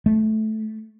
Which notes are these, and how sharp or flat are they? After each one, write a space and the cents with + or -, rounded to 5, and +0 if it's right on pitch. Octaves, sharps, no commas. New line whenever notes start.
A3 -15